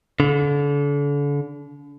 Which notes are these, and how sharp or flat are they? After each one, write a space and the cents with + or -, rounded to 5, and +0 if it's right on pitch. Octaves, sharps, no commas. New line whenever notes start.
D3 -35